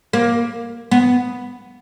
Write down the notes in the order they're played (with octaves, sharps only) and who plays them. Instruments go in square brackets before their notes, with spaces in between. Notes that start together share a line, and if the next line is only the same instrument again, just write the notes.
[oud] A#3
B3